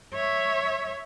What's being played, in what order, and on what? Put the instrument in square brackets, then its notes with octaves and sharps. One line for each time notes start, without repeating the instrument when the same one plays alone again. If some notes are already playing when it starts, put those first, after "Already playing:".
[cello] C#5 E5